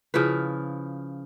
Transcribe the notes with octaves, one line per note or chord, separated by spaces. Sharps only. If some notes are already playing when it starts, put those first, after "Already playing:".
C#3 F3 E4 B4